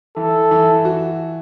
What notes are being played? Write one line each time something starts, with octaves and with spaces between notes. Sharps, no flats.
E3 A4
E3
F#4